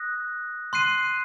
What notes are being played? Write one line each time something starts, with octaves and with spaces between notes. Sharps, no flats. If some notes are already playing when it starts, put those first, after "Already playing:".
Already playing: D#6 F#6 A#6
C6 F#6 C7 D#7